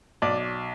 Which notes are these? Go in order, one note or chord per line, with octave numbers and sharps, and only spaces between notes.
B1 D5